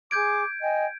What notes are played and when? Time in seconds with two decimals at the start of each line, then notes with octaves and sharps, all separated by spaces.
0.11 G#4 D6 G6 G#6 D7
0.61 D#5 G5 G#5